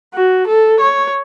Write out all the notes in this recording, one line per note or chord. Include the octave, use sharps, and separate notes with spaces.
F#4
A4
C#5